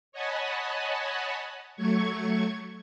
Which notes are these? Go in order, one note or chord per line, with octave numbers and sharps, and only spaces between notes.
C#5 D#5 F#5 G#5 A5 B5
F#3 A3 C#6 G#6